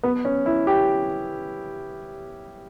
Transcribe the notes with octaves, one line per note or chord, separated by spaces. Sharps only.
B3
C#4
E4
G4